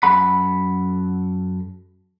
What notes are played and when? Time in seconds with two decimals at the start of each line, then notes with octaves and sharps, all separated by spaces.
0.03 F#2 A4 F#5 B5